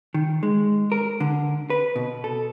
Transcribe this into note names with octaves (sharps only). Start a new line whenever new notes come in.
D#3
G#3
A#4
D3
B4
B2
A4